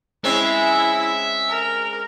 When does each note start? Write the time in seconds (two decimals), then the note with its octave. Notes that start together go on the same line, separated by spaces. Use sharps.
0.24 G#3 C4 C#4 E4 E5
1.49 A#4